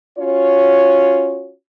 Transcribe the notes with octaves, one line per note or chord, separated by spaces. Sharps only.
C#4 F4 F#4 C#5